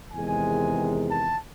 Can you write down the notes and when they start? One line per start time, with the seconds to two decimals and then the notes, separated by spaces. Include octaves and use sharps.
0.12 E2 C3 D#3 G#3 G#5
1.08 A5